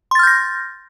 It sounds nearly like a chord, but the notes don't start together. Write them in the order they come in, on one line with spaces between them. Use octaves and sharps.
C6 A6 F6 G6 A#6